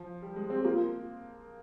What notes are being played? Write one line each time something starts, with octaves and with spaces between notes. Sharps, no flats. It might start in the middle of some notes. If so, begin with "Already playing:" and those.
Already playing: F3
G3
G#3
C4 G#4
G4
A#3 F4